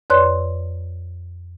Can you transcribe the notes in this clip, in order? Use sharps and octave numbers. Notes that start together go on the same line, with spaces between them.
F2 B4 C#5 D5 C6 F#6